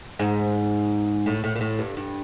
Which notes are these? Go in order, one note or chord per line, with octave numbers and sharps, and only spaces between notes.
G#2
A2
A2
A#2
A2
G2
G2